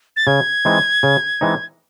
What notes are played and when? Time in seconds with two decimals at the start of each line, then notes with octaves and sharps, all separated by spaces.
0.16 A6
0.27 C#3 G#6
0.65 E3 G#3 C4 D#4
1.03 C#3
1.41 E3 G#3 C4 D#4